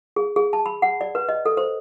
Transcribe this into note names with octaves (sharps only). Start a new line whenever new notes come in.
G#4
G#4
A5
B5
F#5
D5
B4
D#5
A4
C5